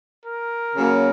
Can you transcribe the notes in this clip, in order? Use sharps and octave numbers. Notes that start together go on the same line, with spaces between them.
A#4
C#3 F#3 A#3